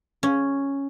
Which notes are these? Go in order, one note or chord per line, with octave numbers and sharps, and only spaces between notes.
C#4